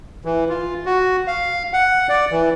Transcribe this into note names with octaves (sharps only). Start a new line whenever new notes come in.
E3
F4
F#4
F5
F#5
D5
E3